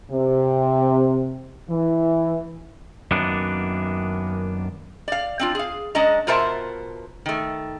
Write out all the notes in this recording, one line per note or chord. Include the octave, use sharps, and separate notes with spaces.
C3
E3
F#2 D#3 A#3 B3 D4
D5 F5
C4 D4 F4
G#4 F5
G#3 C#4 D4 D#5 A#5
B2 F4 A#4 C5 E5 A5
D#3 A3